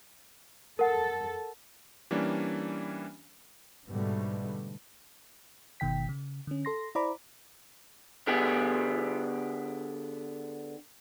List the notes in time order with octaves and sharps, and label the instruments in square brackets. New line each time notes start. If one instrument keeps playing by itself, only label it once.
[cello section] A4 [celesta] A#4 F#5
[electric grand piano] E3 G3 A#3 C#4 D4
[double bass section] G#2 B2 D3 G3 A3
[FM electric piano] G1 B2 D#3 G5 B6
C#3
D3 C#4
A4 C6 A#6
E4 C5 D5 A#5 B5 D6
[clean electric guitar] D3 B3 G4 G#4